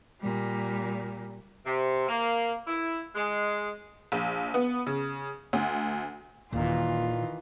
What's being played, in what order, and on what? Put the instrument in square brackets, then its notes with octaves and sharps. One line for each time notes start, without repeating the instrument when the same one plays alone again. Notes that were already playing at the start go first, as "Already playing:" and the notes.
[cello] A#2 G3
[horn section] C3
A#3
E4
G#3
[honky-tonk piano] A#1
B3
C#3
D2
[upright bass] D#1 D#2 [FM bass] A#2 [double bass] D#3 E3 [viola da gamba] F4